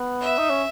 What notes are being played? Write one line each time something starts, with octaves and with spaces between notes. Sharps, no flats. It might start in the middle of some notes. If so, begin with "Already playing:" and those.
Already playing: B3
E5
D#4
C#4